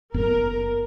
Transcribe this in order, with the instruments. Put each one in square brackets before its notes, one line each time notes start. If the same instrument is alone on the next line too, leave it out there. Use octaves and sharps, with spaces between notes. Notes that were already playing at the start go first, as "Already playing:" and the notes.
[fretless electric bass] F#1 F#2 B3 [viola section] A#4